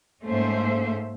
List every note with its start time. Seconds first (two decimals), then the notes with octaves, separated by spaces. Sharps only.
0.24 G#2 A3 A#3 C#4 C5 E5